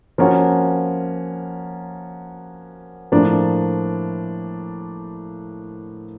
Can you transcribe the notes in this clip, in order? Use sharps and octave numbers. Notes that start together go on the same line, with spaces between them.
F3 A#3 C#4 F#4
A2 F3 A#3 D4